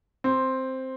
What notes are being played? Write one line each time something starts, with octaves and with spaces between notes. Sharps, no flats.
C4